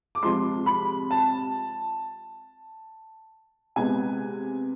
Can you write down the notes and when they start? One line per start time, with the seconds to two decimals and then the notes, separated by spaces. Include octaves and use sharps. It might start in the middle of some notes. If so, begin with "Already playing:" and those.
0.15 D6
0.23 C3 F3 G#3 C6
0.66 B5
1.11 A5
3.76 C3 G#3 B3 G#5